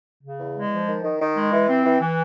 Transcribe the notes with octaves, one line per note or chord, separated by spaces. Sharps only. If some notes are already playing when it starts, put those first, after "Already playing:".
C#3
E2
G#3
F3
D#3
D#3
D#3
G#3
E3
C4
E3
E3